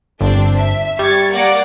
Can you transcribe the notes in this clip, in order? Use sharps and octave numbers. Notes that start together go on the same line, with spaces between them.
G1 C4 D4
E5
G3 C#6 G#6 A6
A#3 D5 F#5